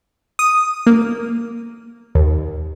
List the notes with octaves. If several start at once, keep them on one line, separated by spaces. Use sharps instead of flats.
D#6
A#3
D#2